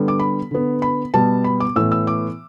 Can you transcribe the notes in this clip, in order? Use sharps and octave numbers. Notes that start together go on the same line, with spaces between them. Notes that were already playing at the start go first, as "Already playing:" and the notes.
Already playing: D3 G3 B3
D6
B5
D3 B3
B5
B2 G3 B3 A5
B5
D6
A2 E3 B3 E6
E6
D6